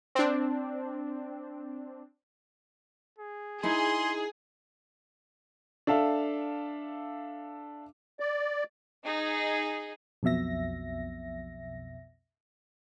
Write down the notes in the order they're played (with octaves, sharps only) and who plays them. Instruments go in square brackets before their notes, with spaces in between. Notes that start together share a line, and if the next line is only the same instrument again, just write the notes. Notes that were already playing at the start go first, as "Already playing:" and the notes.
[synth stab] C4 D4
[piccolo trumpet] G#4
[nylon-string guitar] D#4 E4 [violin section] G#4 [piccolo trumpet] G#5 [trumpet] C6
[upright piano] D4 A4 E5 F5
[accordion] D5
[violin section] D#4 G#4
[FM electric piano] B1 F2 B2 E5 A#6